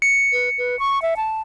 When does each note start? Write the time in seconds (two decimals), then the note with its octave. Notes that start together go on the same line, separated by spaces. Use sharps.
0.02 C#7
0.32 B4
0.58 B4
0.79 C#6
1.02 E5
1.17 A5